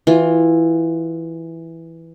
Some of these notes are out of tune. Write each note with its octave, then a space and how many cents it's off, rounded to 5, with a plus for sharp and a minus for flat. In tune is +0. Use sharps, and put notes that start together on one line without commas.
E3 +0 F4 +15